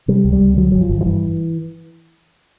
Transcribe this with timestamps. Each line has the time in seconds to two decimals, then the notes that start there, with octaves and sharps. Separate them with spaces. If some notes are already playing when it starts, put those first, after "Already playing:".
0.08 C3 G3
0.25 C#2
0.33 G3
0.41 C#2
0.57 D3 F#3
0.72 G1 F#3
0.81 F3
0.89 G1
1.01 F3
1.06 G2 E3